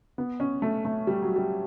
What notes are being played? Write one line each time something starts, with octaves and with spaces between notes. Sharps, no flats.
B3
C#4
A3
A3
G3
F#3
G3